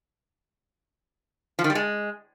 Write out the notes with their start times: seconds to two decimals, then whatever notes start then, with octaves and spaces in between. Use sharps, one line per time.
1.59 F3
1.64 D#3
1.70 G3
1.75 G#3